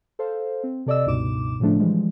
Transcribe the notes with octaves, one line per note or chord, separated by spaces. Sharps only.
A4 C5 F5
C4
C3 A4 D5 D#5 E6
C#2 G2 B2 D#4 D6 E7
A2 C#3 F3 A3 D4
E3 F3 G3 G#3